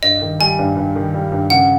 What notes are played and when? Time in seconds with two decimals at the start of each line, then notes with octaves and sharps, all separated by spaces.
0.03 G2 D#5
0.22 D#3
0.40 G3 G#5
0.59 G2
0.77 G2
0.96 D#3
1.14 G3
1.32 G2
1.50 C#3 F#5